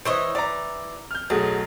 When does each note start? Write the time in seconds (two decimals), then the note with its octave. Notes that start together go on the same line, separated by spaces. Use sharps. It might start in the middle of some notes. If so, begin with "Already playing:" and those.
0.05 E3 C5 C#5 D#5
0.35 E3 D5 A#5
1.11 F6 G6
1.30 B1 F#3 A3 G#4